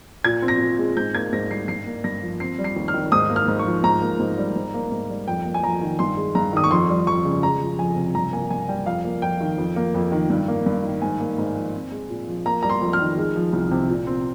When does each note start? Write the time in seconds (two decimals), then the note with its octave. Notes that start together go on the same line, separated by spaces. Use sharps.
0.24 A#2 G#6
0.42 C4
0.48 A#6
0.60 A#2
0.79 G#3
0.97 G#2 G6
1.15 A#3 G#6
1.33 G#2 A#6
1.50 G3 C7
1.68 G2 C7
1.86 A#3
2.04 G2 A#6
2.22 F3
2.40 C4 C7
2.58 G3
2.64 C7
2.76 D#2
2.88 F6
2.94 D#3
3.12 G#2 D#6
3.29 A#3
3.36 F6
3.48 G#2
3.59 C#6
3.65 F3
3.83 G#2 A#5
4.02 A#3
4.19 G#2
4.38 G3
4.56 G#2
4.74 A#3
4.92 G#2
5.10 G3
5.28 F2 G5
5.45 A#3
5.54 G#5
5.63 F2 A#5
5.81 D#3
5.99 G2 C6
6.17 G#3
6.35 G2 A#5
6.53 D#3 D#6
6.64 C#6
6.71 F2 C6
6.89 G3
7.07 F2 C#6
7.25 C#3
7.42 G#3 A#5
7.61 F3
7.79 F2 G#5
7.96 C3
8.15 G2 A#5
8.33 A#3 G#5
8.51 G2 G#5
8.68 G3 G5
8.86 F2 F5
9.05 A#3
9.22 F2 G5
9.41 D#3
9.58 F2
9.76 A#3
9.95 F2
10.12 D#3
10.30 G2
10.48 A#3
10.66 G2
10.84 D#3
11.02 G#2 G#5
11.20 A#3
11.38 G#2
11.56 F3
11.74 C4
11.92 G#3
12.09 A#2
12.28 F3
12.46 A#3 A#5
12.63 G3 A#5
12.70 C6
12.81 F2
12.93 F6
12.99 D#3
13.18 G#3
13.36 F3
13.53 C2
13.71 C3
13.89 A#2
14.07 C4